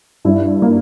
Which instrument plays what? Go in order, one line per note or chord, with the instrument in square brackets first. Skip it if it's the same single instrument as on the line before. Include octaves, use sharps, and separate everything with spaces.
[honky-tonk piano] G2 E4
A#3